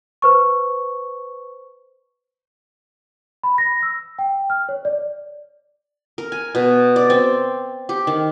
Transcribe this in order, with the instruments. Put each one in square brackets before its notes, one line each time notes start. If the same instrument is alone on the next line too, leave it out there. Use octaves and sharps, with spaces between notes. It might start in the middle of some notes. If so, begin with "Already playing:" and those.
[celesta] B4 C5 C#6
B5
A#6
E6
G5
F6
C#5
D5
[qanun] A#4
G#5
B2
D5
C4
G4
D#3